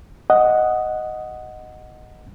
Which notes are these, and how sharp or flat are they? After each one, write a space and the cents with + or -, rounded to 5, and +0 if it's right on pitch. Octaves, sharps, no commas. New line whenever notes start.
D#5 +0 F#5 +0